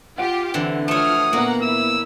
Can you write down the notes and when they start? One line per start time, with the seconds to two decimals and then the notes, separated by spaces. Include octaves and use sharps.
0.18 F4 G4 F#5 D7
0.54 D3 E3 C4
0.88 F3 A3 C#5 D#6 F6
1.33 A#2 A#3 B3 F#5 A#5
1.62 E4 E6